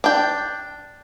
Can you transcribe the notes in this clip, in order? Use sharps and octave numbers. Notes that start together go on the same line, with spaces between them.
D4 G5